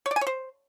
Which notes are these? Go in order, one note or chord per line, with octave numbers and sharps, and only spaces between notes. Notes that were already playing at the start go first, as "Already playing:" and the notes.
C#5
D5
G#5
C#5
C5